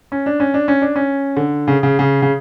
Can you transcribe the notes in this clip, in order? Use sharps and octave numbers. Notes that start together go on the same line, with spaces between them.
C#4
D4
C#4
D4
C#4
D4
C#4
D3
C#3
C#3
C#3
C#3